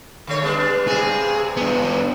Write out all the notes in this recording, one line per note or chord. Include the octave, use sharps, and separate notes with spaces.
D3 A3 C#5
G3 B3 D4
G2 C3 G#4
B3 D4